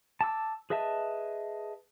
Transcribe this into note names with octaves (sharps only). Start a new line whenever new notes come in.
A5 D6 E6
G#4 B4 D#5 E5 A5